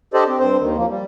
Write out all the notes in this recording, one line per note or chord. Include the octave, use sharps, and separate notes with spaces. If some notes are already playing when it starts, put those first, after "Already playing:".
D4 G4 A4 C5 D5 D#5
C4
G2 C4 C5
D#2 D#3
F3 A#3
G3